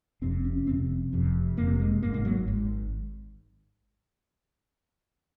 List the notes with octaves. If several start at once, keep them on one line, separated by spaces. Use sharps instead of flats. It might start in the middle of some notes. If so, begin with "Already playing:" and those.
F1 F2 C3 C4
C#4
F1 F2 C3 C4
F1 F2 C3
F1 F2 C3 A#3
G#3
G#1 G#2 A#3
A#3
F#3
G#1 G#2